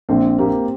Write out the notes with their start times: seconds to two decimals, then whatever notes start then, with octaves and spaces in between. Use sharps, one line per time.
0.09 A#1 C4
0.38 A#3 G4